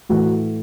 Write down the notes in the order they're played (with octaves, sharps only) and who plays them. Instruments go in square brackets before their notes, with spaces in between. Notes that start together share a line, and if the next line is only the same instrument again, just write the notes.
[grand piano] A2 E3 A3 F#4